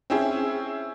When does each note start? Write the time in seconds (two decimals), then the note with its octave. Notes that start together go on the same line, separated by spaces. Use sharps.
0.10 C4 C#4 E4 G#4